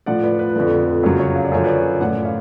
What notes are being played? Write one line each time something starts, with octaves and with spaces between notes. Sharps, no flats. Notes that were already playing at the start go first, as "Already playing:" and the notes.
A2 F3 D5 F#5
B4 D5
B4
F2 D3 F3
F#2 C#3 F#3 C#5
C#5
F5
D5
F#2 D3 F3 C#5
B4 D5
A2 F3 D5 F#5
C#5 F5